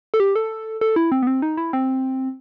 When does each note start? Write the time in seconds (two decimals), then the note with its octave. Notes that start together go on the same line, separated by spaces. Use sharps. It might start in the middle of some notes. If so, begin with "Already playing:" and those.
0.14 A4
0.20 G4
0.36 A4
0.81 A4
0.96 E4
1.12 C4
1.23 B3
1.27 C4
1.42 D#4
1.57 E4
1.73 C4